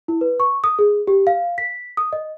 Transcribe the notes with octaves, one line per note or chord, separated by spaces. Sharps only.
E4
B4
C#6
D#6
G#4
G4
F5
B6
D#6
D#5